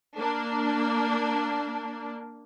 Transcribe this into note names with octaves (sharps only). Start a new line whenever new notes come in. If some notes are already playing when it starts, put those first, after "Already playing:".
A#3 D4